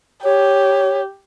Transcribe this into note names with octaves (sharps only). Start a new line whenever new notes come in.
G4 C#5